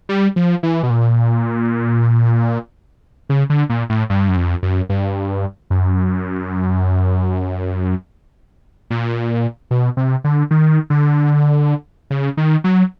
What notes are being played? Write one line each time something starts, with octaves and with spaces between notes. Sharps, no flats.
G3
F3
E3
B2
A#2
C#3
D3
A#2
A2
G2
F#2
F2
F#2
G2
F#2
A#2
B2
C3
D3
D#3
D3
C#3
D#3
F#3